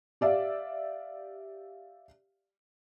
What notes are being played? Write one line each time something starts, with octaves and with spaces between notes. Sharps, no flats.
G4 D5 E5 F5